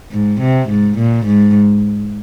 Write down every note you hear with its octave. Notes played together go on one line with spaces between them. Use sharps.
G#2
C3
G#2
A#2
G#2